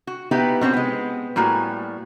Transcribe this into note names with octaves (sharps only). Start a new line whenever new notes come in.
F#4
B3 D#4 E4 G4 B4
B2 C4 C#4 F#4
G#3 B3
A2 G3 A#3 F#4 G#5